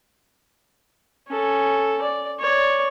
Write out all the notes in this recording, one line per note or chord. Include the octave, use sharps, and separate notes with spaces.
C#4 A4
D5
C#5 D5